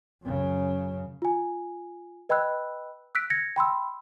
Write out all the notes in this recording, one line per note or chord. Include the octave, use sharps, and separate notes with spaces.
F#2 C#3
F4 G#5
B4 D#5 G5 B5 E6 F#6
E6 F#6 B6 D7
G#6 A#6 C#7
G5 B5 C6 E6